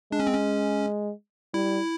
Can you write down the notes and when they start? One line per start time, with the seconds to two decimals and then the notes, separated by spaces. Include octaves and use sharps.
0.12 G#3 D4
0.20 C#4
0.27 C4
0.33 C#4
1.54 G3 E4